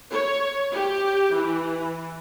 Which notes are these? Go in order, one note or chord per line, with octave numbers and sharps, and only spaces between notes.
C#5
G4
E3